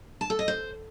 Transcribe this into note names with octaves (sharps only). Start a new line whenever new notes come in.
A5
A4
D#5
C5